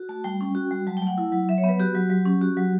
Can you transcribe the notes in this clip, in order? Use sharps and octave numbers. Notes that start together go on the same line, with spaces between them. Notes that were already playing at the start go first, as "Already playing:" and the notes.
Already playing: F#4
A3 A5
G3 G5
C#4
F#4
G3
F#3 A5
G5
A3
F#5
E4
F#3
F#3 E5
C#5
B3 B4
F#4 G4
F#3
F#3
C#4
F#4
F#3